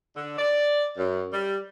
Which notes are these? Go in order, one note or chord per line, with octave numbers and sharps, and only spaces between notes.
D3
D5
F#2
G3